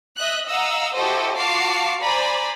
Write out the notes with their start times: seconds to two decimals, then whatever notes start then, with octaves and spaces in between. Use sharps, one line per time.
0.17 D#5 E5 F#6
0.48 D#5 F5 F#5 A#5 E6
0.94 E4 F#4 G4 A4 C5 D#5
1.35 F4 F#4 F5 A5 D6 C7
2.01 C5 D5 G#5 A#5 B5